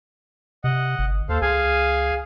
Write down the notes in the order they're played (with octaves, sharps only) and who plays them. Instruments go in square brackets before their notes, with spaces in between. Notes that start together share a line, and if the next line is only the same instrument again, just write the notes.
[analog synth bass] C3 [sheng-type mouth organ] D#5 F#5
[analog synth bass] G1
[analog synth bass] D#2 [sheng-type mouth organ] A4 C5 F5
[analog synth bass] C#2 [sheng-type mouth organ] G#4 F5 G#5